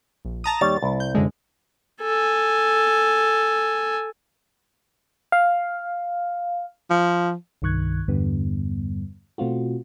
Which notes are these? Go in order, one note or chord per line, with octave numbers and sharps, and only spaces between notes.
A#1
A5 A#5 D#6
D#2 G3 C#5 A6
C2 E4
G6
F#2 D3 G#3
A4 G#5
F5
F3
C2 G2 D#3 C#6 F#6 G#6
E2 G2 D3 G3 B3
B2 A3 C4 F4 F#4